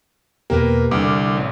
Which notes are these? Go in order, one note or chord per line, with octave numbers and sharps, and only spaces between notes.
E2 B2 A#3 G4 A#4 B4
C2 D3 D6 F6
A1